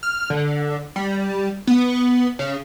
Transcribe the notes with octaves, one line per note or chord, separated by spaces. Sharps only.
F6
D3
G3
B3
C#3